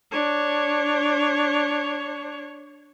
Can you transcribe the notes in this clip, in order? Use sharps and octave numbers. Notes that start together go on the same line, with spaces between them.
D4 C#5